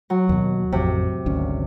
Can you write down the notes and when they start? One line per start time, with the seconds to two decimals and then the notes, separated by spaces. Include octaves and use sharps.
0.10 F#3
0.29 D#2 B2
0.72 A1 F2 C3
1.26 G#1 D2 C#4